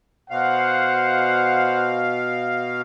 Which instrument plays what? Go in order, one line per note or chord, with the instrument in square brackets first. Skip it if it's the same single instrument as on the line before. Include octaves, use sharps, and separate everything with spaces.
[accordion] B2 F5 [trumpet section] C5 F#5